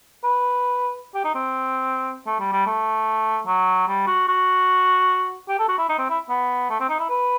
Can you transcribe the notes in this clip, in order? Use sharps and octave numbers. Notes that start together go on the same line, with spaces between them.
B4
G4
D#4
C4
A3
G3
G3
A3
F#3
G3
F#4
F#4
G4
A4
F#4
E4
D#4
C4
E4
B3
A3
C4
D#4
E4
B4